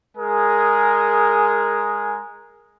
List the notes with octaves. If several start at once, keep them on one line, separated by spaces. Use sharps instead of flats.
G#3 G#4 A#4